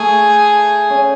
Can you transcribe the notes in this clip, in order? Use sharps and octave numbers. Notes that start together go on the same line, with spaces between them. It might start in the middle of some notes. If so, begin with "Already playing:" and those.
Already playing: A3 G#4
C#4